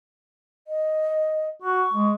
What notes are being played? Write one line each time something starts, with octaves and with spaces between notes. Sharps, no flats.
D#5
F#4 C#6
G#3